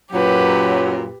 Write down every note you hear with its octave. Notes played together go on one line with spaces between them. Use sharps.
F#2 A#2 F#3 G4 B4